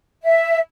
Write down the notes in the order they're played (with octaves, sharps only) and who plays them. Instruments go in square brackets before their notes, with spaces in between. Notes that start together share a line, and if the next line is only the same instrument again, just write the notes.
[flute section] E5